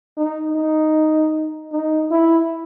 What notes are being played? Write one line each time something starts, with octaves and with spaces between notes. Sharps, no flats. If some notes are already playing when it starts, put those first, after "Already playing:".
D#4
D#4
D#4
E4